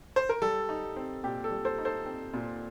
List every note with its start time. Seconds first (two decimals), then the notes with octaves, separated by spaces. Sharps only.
0.16 C5
0.29 A#4
0.42 G3 A4
0.69 D#4
0.96 C4
1.24 A#2 G4
1.44 A4
1.51 G3
1.65 A4 C5
1.78 D#4
1.85 A4 C5
2.06 C4
2.33 A#2